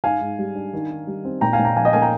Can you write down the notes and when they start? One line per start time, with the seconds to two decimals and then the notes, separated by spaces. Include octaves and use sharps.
0.04 G#2 F5 G#5
0.21 G#2
0.39 G3
0.55 D4
0.73 D#3
0.90 D#4
1.07 G3
1.25 C4
1.41 A#2 G5 A#5
1.53 F5 G#5
1.59 A#2
1.65 G5 A#5
1.76 F3 F5 G#5
1.85 D#5 G5
1.93 A#3 F5 G#5
2.02 G5 A#5